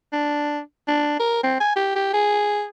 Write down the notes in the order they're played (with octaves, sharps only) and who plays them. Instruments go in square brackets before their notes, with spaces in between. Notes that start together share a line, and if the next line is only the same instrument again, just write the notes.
[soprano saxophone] D4
D4
A#4
C4
G#5
G4
G4
G#4